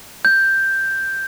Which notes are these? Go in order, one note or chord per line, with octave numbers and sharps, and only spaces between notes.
G6